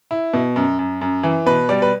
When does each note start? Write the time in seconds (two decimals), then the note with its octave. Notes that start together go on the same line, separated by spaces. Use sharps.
0.11 E4
0.33 B2
0.56 F#2
0.79 F#2
1.01 F#2
1.23 E3
1.46 B2 B4
1.69 G3 D5
1.82 B4